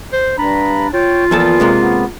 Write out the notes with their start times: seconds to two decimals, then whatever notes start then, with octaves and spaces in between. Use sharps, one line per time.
0.13 C5
0.38 G2 D4 A#5 B5
0.94 F4 C#5 G5
1.31 E2 A#2 F3 B3 A4
1.60 C3 G#3 A#3
1.82 B3